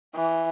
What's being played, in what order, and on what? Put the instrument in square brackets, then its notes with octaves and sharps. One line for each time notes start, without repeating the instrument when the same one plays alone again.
[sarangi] E3